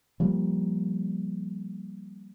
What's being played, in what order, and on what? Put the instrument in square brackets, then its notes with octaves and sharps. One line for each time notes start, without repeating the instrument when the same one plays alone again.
[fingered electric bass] F3 G3 A#3